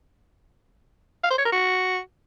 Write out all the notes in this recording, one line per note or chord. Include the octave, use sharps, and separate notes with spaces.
F5
C5
C#5
A#4
F#4